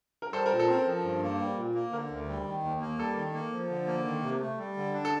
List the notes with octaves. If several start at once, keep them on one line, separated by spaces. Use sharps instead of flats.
A#4
G3 A4 C5
A#4
A#2
A4
C4 A#4 C5
F3
G2
A#3
G3
A#2
A#3
D3 A#4
D2
G3
D#3
D#2
A#3
G3 A4
D#3
A#3
F3
D3
A#3
D#3
C3
A3
G3
D3
D4
A4